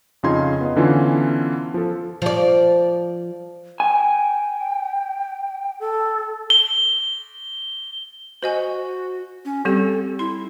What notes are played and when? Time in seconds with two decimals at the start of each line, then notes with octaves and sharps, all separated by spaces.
0.23 F2 C#3 D#4 F4 C6 G#6
0.61 B3 D#5
0.76 D3 E3 B3 C#4 F4
1.74 F3 A4
2.22 F3 D5
3.80 G5 G#5
5.80 A4
6.50 G7
8.43 F#4 C5 D#5 G#5
9.45 C#4
9.65 G3 C4 G4 A4
10.19 E4 C6